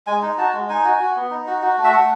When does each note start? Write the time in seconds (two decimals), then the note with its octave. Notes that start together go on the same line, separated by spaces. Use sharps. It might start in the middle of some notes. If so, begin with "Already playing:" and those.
0.07 G#3 G#5
0.22 D#4
0.38 F#4 A5
0.53 G#3
0.69 D#4 G#5
0.84 F#4
0.99 F#4
1.16 B3
1.31 D#4
1.47 F#4
1.62 F#4
1.78 A3
1.84 E5
1.93 A3 F#5